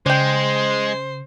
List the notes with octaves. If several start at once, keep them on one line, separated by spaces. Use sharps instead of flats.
C#3 G#3 C5 D5 G5